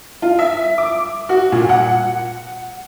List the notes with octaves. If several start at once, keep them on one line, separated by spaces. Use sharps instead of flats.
F4
E5
D6
F#4
A#2
F#5